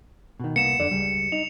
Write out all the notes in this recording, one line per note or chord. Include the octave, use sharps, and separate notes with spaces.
B2 D#3
C2 A#3 B3 C#7 E7
F2 D3 D5
C#2 G3
D#4 F7